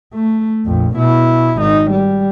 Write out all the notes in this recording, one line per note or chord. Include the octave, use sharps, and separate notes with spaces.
A3
A#1 F2
B2 E4
G#1 D#4
G3